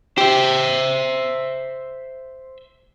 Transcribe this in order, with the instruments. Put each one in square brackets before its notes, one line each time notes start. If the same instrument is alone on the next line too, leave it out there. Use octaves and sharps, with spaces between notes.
[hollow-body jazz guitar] G4 [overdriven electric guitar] C5 E5